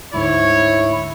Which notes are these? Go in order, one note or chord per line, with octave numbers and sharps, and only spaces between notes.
D2 G#2 D3 E4 C#5